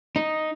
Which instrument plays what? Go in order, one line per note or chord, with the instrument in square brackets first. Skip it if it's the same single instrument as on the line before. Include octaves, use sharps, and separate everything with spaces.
[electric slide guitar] D#4